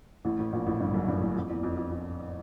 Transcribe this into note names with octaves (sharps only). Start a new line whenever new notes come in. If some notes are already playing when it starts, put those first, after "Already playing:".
A1 A2
A1 A2
A#1 A#2
A1 A2
G1 G2
F#1 F#2
G1 G2
F#1 F#2
F2
E2
F2
F2
F2